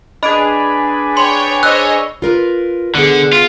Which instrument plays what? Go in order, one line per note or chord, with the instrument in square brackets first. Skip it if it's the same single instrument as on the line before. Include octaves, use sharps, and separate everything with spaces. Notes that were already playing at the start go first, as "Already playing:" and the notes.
[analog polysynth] D4 G#4 B4 [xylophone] D#5 [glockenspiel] B5 D7
[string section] C#5 G5 [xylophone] C6
[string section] C5 C#5 D#5 [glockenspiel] E6 [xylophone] F#6
[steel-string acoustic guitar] F4 A#4 B4
[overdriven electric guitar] D3 [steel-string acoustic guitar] B3 G#4
[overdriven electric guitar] F4